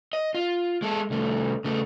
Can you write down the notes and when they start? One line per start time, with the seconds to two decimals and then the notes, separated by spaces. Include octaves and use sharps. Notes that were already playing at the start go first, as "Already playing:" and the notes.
0.13 D#5
0.34 F4
0.82 G#3 A4
1.10 C2 A3
1.65 C#3 A3